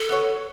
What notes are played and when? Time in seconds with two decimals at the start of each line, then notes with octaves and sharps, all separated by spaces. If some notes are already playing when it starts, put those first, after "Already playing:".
Already playing: A4
0.09 B3 F#4 C#5